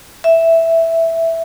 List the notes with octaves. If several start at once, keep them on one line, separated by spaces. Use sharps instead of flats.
E5